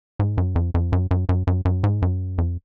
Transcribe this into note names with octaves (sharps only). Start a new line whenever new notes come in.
G#2
F#2
F2
F2
F#2
F#2
F#2
F#2
F#2
G#2
F#2
F2